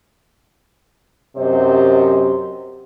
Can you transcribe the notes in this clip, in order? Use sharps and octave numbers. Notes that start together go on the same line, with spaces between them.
F#2 C3 G4 C5 D#5